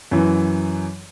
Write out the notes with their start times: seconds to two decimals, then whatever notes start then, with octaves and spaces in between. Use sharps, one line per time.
0.11 F#2 E3